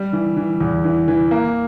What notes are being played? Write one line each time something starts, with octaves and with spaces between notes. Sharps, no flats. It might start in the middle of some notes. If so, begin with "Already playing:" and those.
Already playing: G3
E3
E3
E2
E3
E3
A#3